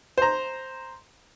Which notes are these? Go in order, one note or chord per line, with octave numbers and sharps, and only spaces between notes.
C5 A#5